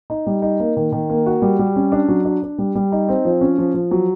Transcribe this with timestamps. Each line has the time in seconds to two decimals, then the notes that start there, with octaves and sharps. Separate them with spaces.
0.10 D#4
0.26 G3
0.42 D#4
0.60 A#3
0.77 D#3
0.92 D#3
1.10 A#3
1.26 F#4
1.42 G3
1.59 G3
1.76 C#4
1.92 D4
2.08 F#3
2.25 D4
2.43 D4
2.58 G3
2.75 G3
2.92 D#4
3.09 C4
3.25 F3
3.41 C#4
3.58 F3
3.74 F3
3.91 F#3